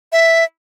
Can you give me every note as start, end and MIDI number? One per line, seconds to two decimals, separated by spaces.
0.12 0.44 76